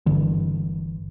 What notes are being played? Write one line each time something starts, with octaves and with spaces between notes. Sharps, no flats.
G1 D3 E3